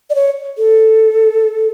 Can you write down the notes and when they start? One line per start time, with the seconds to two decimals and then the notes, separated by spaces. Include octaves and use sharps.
0.10 D5
0.15 C#5
0.58 A4